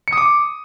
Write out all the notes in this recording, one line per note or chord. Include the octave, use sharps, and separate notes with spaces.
C#7
D#6
D6